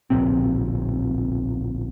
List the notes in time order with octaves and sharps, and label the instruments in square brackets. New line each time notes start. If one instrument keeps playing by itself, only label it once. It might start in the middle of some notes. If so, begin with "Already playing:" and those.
[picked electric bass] D1 A#1 C3 C4